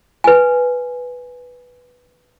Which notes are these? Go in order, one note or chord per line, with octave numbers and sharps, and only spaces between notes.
B4 G#5